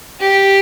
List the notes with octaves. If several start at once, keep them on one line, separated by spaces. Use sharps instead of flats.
G4